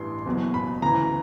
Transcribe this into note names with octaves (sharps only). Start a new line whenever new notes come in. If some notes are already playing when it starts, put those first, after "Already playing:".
Already playing: A1 G2 E3 C6
F#1 E2 B2 F#3
B5
D2 C#3 E3 A#5